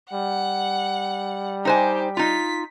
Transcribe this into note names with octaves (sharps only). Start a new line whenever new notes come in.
G3 F#5
D#4 G4 C5 G#5
D#4 F4 B6